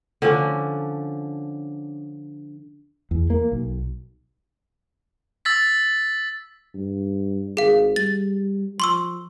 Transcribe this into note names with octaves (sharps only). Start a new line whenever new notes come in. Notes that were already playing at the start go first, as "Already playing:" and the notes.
D3 F3 C#4 D4
E2
A#3
B1
E6 A6 B6
G2
G#1 G#4 F5
G3 A6
F3 C6 C#6 E6